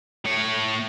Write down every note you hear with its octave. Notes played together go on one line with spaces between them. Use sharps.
A2 C#5